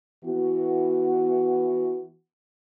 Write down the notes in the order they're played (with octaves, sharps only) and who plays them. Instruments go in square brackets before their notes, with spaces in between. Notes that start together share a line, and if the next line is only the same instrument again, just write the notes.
[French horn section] E3 B3 F#4